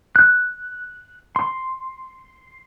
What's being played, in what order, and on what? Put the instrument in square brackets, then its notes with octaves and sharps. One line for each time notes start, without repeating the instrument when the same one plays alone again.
[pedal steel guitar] F#6
C6